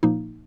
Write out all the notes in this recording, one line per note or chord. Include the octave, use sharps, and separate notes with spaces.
A#2 F3 A#3 D#4